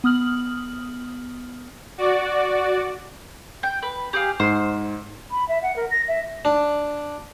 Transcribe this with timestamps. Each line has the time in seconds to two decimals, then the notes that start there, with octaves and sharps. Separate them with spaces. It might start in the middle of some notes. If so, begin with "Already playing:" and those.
0.04 B3 D#6 F6 F#7
1.98 F#4 D5
3.63 G5
3.83 B4
4.13 G4 G#4 F5
4.40 G#2 C5
5.31 B5
5.49 E5
5.63 F#5
5.76 A#4
5.91 A#6
6.08 E5
6.45 D4